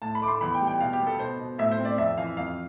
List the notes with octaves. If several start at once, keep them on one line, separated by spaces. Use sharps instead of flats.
A2 A5
B5
A3 D6
C6
E2 B5
G5
G3
G5
B2 F5
G4
B3
A4
B2 C5
B2
A2 E5
C5
C4
D5
F2 E5
E3 F5
F2 F5